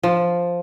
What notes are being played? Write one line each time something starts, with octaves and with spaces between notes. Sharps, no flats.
F3